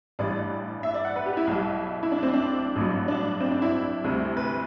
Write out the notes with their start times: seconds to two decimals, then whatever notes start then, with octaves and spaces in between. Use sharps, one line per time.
0.19 A1 G2 E3 G3 D5
0.83 E5
0.94 D5
1.05 F#5
1.16 B4
1.26 G4
1.37 E4
1.47 B1 B2 G3
2.03 E4
2.12 D4
2.23 C4
2.33 D4
2.76 A1 G2 F#3
3.08 D4
3.40 C4
3.52 D4
3.62 E4
4.04 D2 C3 G3
4.37 B4